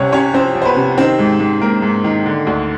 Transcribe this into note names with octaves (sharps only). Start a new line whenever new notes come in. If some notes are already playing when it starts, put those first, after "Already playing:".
Already playing: C2 C3 C4 C#4 C#5
C3 C#4 C#5
F3 C4 C5
F3
C5
B3 B4
C3
D#3 C4 C5
G#2
G#2
G#2 A#3 A#4
G#2
D#3
D3
D2